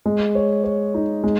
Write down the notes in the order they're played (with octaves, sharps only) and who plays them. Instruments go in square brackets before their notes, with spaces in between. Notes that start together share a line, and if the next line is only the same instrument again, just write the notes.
[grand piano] G#3
C#5
C#5
D#4
G#3